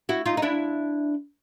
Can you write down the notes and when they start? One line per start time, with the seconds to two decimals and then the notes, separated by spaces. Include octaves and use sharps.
0.09 E4 F#4
0.26 D#4 F4
0.37 D#4
0.42 D4 E4